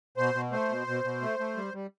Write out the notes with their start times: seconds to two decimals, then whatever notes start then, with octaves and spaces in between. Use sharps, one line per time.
0.17 B2 C5
0.34 B2
0.52 A3 C5
0.69 B2
0.87 B2
1.04 B2
1.22 A3
1.39 A3
1.56 G3
1.74 G3